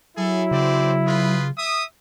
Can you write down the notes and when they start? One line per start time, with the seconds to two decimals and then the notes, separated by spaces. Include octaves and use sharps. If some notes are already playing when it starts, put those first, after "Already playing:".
0.17 F#3 E4 G#4 A4
0.51 C#3 C4 C5 D5
1.06 F4 G#4 B4
1.57 E5 D#6